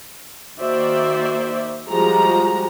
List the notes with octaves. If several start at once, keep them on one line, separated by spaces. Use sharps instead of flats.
D#3 A#3 F#4 C5 D5 E5
F3 G3 G#3 F#4 A#5